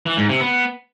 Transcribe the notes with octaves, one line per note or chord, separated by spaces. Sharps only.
E3
G#2
C3
B3